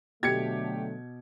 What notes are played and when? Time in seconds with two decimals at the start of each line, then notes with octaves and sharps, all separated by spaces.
0.23 B2 D3 F#3 A3 G4 G#6 C#7